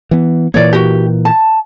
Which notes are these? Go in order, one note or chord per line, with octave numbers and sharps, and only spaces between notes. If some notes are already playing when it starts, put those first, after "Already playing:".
E3 B3
A#2 E3 A#3 C#5 D5
F#4 G4
A5